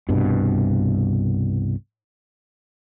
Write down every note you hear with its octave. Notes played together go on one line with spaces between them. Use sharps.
C2 G2 B2